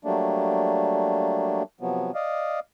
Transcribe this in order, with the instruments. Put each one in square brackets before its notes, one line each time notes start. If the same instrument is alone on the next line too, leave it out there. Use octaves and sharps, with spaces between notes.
[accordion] F#3 G3 A3 A#3 D4
C3 F3 F#3 B3
D5 D#5 F5